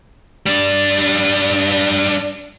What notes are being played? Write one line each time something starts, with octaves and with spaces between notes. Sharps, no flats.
G3 D4